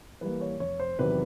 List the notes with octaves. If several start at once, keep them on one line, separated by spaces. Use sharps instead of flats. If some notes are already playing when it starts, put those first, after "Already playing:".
E3 G3 A#3 B4
C#5
F1 C#5
C5
E2 C3 D#3 F#3 B4